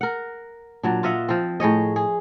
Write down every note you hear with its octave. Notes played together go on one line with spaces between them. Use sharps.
A#4 F#5
A#2 F#3 D4
F4 D#5 E5 F#5
F3 C4
A2 G#4 C#5 D#5
G#4